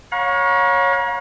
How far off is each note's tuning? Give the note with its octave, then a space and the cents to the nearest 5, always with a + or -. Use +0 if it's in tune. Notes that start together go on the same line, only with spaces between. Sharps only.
C#5 -5 F5 +45 A#5 +40